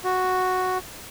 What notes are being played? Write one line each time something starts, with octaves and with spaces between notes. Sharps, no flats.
F#4